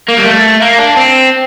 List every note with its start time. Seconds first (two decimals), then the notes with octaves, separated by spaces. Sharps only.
0.08 A#3
0.17 G3
0.26 A3
0.62 A#3
0.79 D4
0.97 C4